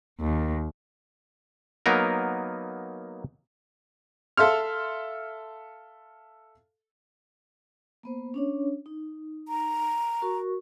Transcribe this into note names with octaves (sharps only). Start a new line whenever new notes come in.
D#2
F#3 A#3 B3 D#4 A#4
A4 E5 F5 C6 F6
A#3 B3 C5
C#4 D4 C#5
D#4
A#5
F#4 A#4 C#6